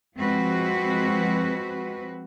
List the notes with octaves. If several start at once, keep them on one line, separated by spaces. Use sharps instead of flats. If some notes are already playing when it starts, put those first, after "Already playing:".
F3 G#3 C4 F#4 B4